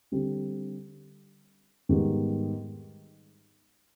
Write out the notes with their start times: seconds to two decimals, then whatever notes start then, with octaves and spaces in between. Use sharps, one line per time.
0.12 D3 G3 C4
1.89 G#2 D#3 G3 B3